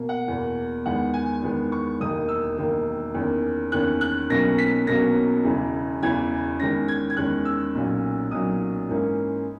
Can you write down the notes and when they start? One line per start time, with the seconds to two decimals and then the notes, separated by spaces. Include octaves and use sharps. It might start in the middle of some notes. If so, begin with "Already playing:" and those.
Already playing: B2 A#3
0.09 F#5
0.28 E2 B2 A#3
0.86 E2 D#3 G#3 B3 F#5
1.14 G#5
1.43 E2 D#3 G#3 B3
1.72 C#6
2.00 E1 D#2 D#3 A#3 D#6
2.29 E6
2.58 E1 D#2 D#3 A#3
3.15 E2 D#3 A#3 C#4
3.72 E2 D#3 A#3 C#4 F#6
4.01 F#6
4.30 B1 B2 F#3 A#3 C#4 A#6
4.58 B6
4.87 B1 B2 F#3 A#3 C#4 A#6
5.45 E1 E2 C#3 E3
6.02 E1 E2 C#3 E3 G#6
6.60 E2 D#3 G#3 C#4 A#6
6.88 G#6
7.10 G#6
7.16 E2 D#3 G#3 C#4 F#6
7.45 E6
7.75 B1 A#2 F#3 C#4
8.31 B1 A#2 F#3 C#4 D#6
8.89 G#2 E3 A#3 C#4